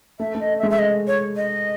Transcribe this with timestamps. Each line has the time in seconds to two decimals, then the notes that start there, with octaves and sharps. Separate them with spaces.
0.20 A3 E5
0.35 A3
0.40 D#5
0.58 E5
0.63 G#3
0.71 E5
0.79 D#5
1.07 C#5
1.36 D#5